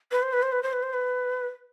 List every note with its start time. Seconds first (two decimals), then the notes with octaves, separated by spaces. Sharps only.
0.12 B4
0.23 C5
0.33 B4
0.42 C5
0.52 B4
0.63 C5
0.73 B4
0.83 C5
0.93 B4